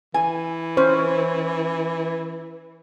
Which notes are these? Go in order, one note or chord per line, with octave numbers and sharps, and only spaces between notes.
E3 G#5
C#4 C5